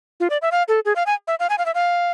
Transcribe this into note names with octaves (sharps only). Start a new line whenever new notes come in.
F4
D5
E5
F5
A4
G#4
F5
G#5
E5
F5
G#5
F5
E5
F5